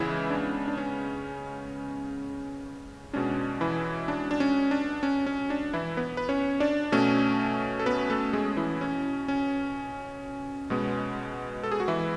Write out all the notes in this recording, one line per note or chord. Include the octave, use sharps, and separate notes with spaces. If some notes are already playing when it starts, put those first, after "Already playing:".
Already playing: C#3 E3 G#3 B3 E4
D4
D4
C#4
B2 G#3 C#4 D4
E3 E4
D4
D4
C#4
D4
C#4
C#4
D4
E3 E4
B3 B4
B4
C#4 C#5
D4 D5
B2 A3 C#4
A4
B3 B4
A3 A4
G#3 G#4
E3 E4
C#4
C#4
B2 G#3 B3
A4
G#4
F#4
E3 E4